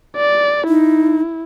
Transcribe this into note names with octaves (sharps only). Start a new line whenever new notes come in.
D5
D#4 E4